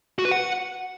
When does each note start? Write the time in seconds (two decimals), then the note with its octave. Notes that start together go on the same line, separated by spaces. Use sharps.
0.19 F#4
0.25 B4
0.31 F#5